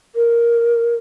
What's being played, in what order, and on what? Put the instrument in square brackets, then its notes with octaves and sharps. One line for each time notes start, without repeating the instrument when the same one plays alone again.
[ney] A#4